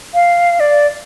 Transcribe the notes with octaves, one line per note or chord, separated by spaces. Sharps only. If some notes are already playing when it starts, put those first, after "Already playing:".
F5
D5